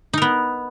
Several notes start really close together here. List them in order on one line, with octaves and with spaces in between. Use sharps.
D#4 A#4 B3